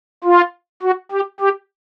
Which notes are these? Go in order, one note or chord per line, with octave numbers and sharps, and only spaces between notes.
F4
F#4
G4
G4